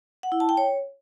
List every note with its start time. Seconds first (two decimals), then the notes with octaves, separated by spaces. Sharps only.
0.23 F#5
0.32 E4
0.40 A5
0.49 G5
0.57 C#5